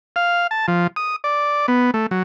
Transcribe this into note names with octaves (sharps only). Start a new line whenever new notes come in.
F5
A5
F3
D#6
D5
B3
A3
F#3